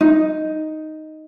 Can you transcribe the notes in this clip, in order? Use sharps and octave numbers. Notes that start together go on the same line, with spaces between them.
D#4